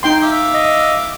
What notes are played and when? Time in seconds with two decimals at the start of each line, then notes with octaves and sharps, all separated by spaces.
0.03 D#4 G5 C6
0.22 E5 F5 D6
0.54 D#5